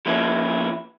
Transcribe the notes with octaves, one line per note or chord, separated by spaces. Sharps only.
F3 A#3 B3 C#4 E4